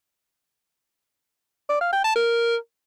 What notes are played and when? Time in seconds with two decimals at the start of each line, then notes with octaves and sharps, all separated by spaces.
1.69 D5
1.81 F5
1.93 G5
2.04 A5
2.16 A#4